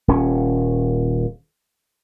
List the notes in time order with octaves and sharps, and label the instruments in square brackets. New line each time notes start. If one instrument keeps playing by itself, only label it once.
[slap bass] D#1 C#4